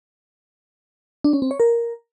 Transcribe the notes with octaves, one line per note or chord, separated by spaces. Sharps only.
D4
C#4
C4
C#5
A#4